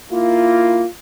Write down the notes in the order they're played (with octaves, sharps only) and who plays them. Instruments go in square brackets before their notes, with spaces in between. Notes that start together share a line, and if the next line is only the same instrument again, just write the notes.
[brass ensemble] A#3 E4 F4